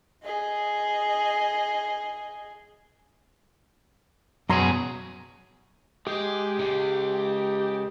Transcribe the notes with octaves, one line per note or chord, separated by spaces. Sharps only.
G#4 D#5
F#2 B2 F#3 G#4 A#5 C6
G#3 G4 G#4
C#3 G#3